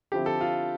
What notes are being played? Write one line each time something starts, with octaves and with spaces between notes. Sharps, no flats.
D3 F3 C4 E4 G4
A4
F4